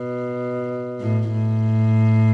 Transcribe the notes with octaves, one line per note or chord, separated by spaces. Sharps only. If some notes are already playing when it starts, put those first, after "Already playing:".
Already playing: B2
A2
A2